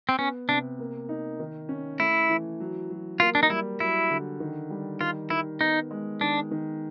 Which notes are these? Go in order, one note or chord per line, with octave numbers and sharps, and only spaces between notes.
C4
B3 C#4
C3 D4
A#3
D#4
D#3
C#4
A3 E4
E3
F#3
F#3
A#3 F4
D4
D#4
G3 E4
F#3 E4
D3
D#3
G3
D#3 F4
D#3 E4
B3 D#4
G#3
D#3 D4
D#3